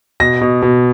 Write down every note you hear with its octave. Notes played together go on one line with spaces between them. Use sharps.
B2 A#6
B2
B2